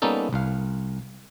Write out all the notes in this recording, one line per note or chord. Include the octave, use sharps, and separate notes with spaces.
G3 A#3 B3 C#4 D#4 A4
C2 F5